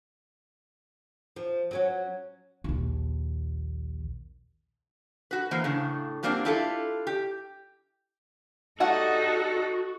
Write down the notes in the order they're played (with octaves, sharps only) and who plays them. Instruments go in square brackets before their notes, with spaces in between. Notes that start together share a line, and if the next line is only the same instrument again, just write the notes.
[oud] F3
F#3 C#4 F#4
[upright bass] A#1 D#2
[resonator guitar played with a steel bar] F#4 B4
E3 A#3 C5
A2 C#3 D4
F#3 G3 A#3 C4 D4 F4
D4 E4 F4 G4 A4
G4
[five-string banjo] G3 A3 F#5 [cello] D#4 A4 [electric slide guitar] F#4